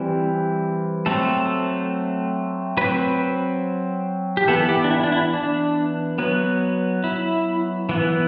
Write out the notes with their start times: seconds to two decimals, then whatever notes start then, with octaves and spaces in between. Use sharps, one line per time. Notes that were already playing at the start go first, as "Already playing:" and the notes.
Already playing: E3 G3 C4
1.06 F#3 A3 C4 A4
2.77 F#3 C4 B4
4.37 G4
4.48 E3 B3 A4
4.69 G4
4.84 D4
4.91 E4
5.04 D4
5.12 E4
5.33 D4
6.18 F#3 B3
7.04 E4
7.89 E3 B3